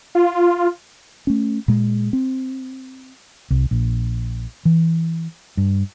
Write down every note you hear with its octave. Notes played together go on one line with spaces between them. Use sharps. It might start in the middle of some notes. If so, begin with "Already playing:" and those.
F4
A3 C#4
A#2 G#3
C4
C2
A#1
E3
G2